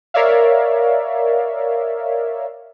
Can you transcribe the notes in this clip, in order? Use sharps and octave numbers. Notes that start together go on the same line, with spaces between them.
A#4 C#5 D5 E5 F5